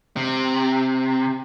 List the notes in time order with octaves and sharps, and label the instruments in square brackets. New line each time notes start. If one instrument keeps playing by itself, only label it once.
[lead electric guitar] C3